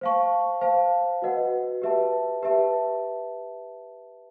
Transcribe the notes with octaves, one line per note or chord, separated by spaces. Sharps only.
C5 F5 A5 C#6
C5 F5 A5
F#4 B4 D#5 F#5
G4 B4 E5 A5
G4 B4 E5 A5